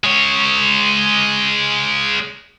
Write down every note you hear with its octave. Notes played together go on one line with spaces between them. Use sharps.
G#3 C#5